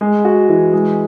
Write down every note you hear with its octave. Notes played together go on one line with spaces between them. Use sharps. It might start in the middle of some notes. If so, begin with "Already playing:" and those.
G#3
F#4
E3
G#3